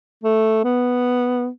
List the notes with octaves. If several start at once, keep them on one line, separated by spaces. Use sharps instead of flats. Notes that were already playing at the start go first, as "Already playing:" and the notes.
A3
B3